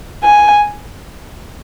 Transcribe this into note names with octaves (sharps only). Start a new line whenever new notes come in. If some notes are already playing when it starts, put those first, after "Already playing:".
G#5